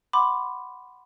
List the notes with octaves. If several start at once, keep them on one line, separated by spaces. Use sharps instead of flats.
F#5 B5 C6 D6